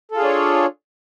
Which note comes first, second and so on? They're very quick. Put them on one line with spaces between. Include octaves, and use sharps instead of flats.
A4 F4 G#4 D4 C#5